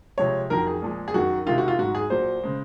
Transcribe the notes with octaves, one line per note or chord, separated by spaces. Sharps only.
C3 F3 G#3 C#5
F2 D#3 F#3 A#4
G#4
A#2 F3 G#3
G#4
F#2 D#3 F#3 F#4
C3 D#3 G#3 F4
F#4
F4
G#2 F#3 F#4
G#4
A#2 F#3 C5
C#3 G#3